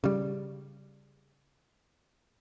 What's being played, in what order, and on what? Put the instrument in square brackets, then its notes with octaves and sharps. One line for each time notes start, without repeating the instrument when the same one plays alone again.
[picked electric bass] C#3 G3